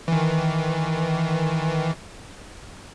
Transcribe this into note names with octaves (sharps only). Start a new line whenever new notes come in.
D#3 E3